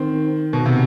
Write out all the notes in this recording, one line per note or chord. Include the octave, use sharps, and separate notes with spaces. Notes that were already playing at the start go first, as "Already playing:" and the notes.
Already playing: D#3 C4
B2
C3